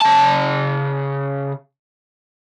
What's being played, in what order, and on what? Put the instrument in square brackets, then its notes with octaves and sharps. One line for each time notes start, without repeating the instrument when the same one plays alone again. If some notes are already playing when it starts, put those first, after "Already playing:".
[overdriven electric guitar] C#3 A5